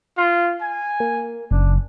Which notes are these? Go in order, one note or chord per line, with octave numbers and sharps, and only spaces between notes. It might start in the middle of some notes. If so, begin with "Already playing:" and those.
F4
G#5
A#3
F#1 D4